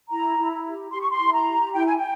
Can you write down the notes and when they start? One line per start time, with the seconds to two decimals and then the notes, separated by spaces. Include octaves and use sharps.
0.10 E4 A#5
0.38 E4
0.66 G4
0.92 G4 C6
1.00 C#6
1.10 C6
1.20 E4
1.33 A#5
1.47 G4
1.73 E4 G5
1.86 G#5
1.97 G5